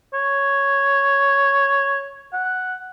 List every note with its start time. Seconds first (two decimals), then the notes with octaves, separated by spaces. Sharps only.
0.14 C#5
2.33 F#5